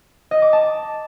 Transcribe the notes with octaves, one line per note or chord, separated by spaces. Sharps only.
D#5
D6
A5